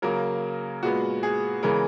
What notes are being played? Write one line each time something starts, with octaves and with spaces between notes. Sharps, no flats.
C#3 F#3 A#3 A#4
A#2 G#3 B3 F#4
G#4
C#3 E3 G#3 B3 A#4